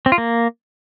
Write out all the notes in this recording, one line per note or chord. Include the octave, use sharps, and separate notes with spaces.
C4
F4
A#3